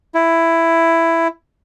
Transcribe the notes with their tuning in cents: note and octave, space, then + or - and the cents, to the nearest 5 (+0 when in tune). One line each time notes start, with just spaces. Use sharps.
E4 +10